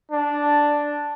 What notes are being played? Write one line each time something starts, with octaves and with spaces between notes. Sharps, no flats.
D4